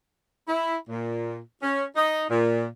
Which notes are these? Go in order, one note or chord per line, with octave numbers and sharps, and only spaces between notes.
E4
A#2
C#4
D#4
A#2